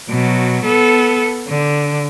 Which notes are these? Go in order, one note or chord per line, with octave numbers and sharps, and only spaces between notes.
B2 F#3
B3 A4
D3